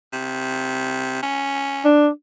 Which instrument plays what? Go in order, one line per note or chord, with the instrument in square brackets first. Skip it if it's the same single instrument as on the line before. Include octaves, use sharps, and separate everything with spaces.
[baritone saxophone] C3
C#4
[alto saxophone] D4